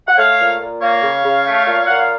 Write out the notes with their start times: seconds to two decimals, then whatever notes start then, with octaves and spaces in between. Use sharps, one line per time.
0.08 F#5
0.17 A3 C#5 F5
0.39 A#2
0.60 A#2
0.81 A#3 C#5 F5
1.03 C#3
1.24 C#3
1.46 A3
1.67 A#2
1.86 A#2 F#5
1.97 F5